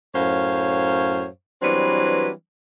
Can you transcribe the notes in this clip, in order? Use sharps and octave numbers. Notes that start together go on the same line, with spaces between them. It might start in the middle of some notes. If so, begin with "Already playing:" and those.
F#2 A2 C5 C#5 F5
E3 F#3 G3 C4 D4 B4